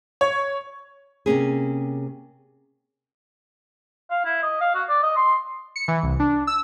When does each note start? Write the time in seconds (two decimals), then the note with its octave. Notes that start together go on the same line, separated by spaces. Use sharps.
0.21 C#5
1.26 C3 A#3 C#4 G#4
4.11 F5
4.25 E4
4.43 D#5
4.61 F5
4.75 F#4
4.89 D5
5.03 D#5
5.16 C6
5.76 C#7
5.88 E3
6.03 C2
6.20 D4
6.47 E6